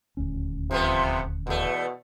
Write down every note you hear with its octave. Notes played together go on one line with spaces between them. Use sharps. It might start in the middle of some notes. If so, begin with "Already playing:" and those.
D#1 D2 C#4
C3 F3 A3 B3
E2 B2 A3